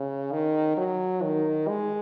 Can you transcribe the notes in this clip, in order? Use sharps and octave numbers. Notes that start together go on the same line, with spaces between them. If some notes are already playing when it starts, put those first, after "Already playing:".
Already playing: C#3
D#3
F#3
D#3
G#3